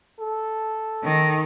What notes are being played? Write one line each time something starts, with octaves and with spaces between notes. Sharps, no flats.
A4
D#3